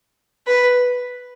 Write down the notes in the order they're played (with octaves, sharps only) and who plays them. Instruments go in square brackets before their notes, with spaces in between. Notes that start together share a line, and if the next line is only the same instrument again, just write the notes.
[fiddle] B4